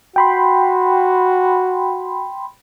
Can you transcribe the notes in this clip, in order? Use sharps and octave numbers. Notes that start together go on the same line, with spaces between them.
F#4 G5 B5 C6